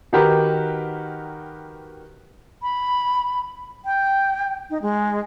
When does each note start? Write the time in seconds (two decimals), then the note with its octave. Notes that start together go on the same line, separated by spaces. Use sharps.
0.13 D#3 D#4 F#4 G4 A#4 B4
2.62 B5
3.85 G5
4.70 D#4
4.82 G#3